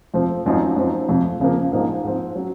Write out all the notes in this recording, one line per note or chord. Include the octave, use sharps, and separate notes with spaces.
F2 C3 F3 C4
G#1 F#2 F3 C4 D#4
F#2 F3 C4 D#4
F2 C3 F3
F2 C#3 F3 A#3
A#1 G#2 F3 A#3 D#4
G#2 F3 C4
F#3 C#4